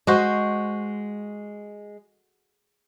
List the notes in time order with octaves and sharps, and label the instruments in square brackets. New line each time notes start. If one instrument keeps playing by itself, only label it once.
[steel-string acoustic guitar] G#3 [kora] F#4 C5 D#5